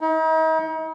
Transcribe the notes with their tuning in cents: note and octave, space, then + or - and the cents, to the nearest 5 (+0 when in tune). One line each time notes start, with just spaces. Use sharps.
D#4 +40